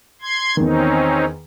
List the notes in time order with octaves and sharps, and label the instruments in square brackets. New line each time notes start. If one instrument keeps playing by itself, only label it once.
[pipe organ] C6 G#6
[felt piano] E2 D#3 [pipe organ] C4 C#4 D#4